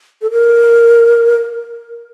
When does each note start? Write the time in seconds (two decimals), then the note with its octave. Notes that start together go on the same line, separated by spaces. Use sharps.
0.22 A4
0.31 A#4